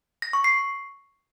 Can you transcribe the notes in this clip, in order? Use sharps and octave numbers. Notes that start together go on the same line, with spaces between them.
A#6
C#6
C7